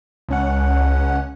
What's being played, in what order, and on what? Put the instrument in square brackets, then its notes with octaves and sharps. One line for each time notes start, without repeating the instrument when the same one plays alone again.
[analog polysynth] C#2 C#4 F#5